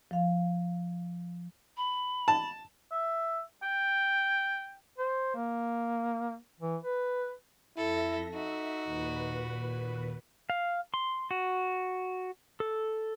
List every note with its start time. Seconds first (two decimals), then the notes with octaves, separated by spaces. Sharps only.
0.11 F3 F5
1.77 B5
2.28 A5
2.92 E5
3.63 G5
4.98 C5
5.35 A#3
6.60 E3
6.83 B4
7.77 F2 E4 A4 E5 A#6
8.34 D#4 F#4 E5
8.84 D#2 A#2 B4
10.50 F5
10.94 C6
11.31 F#4
12.60 A4